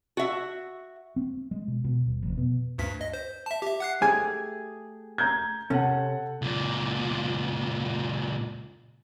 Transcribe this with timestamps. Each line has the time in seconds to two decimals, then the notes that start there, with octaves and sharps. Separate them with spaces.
0.17 F#4 E5
1.16 C4
1.51 G#3
1.68 B2
1.84 B2
2.06 D#1
2.23 F1
2.37 B2
2.78 D2 G2 B6
3.01 D#5
3.14 C5
3.46 E5 A5
3.62 G4 E5
3.80 F#5 F#6 C7
4.02 A3 G4 G#4 G#5
5.18 A#5 G6 G#6
5.70 C3 C#4 A4 F#5
6.42 C#2 A#2